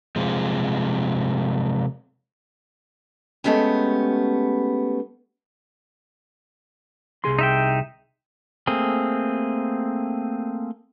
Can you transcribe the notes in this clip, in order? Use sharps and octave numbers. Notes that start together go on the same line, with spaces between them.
C3 F3 G#3
G#3 A3 B3 C#4 G4
C2 G#4 C6
D#4 E5 G5
A3 A#3 C4 G#4